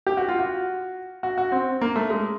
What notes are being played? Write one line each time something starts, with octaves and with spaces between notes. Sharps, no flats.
G4
F#4
F4
F#4
F#4
F#4
C4
A#3
A3
G#3